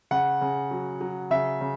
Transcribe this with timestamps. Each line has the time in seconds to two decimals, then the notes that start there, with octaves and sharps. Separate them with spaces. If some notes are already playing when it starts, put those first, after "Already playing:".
0.11 C#3 F#5
0.41 C#3
0.71 F#3
1.01 F#3
1.31 C#3 E5
1.61 C#3